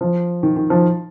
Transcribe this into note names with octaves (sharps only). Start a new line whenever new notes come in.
F3
D#3
D#3
F3